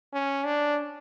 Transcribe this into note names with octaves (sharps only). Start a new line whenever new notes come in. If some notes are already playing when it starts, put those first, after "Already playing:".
C#4
D4